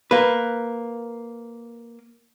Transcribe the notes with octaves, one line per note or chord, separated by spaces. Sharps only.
A#3 B4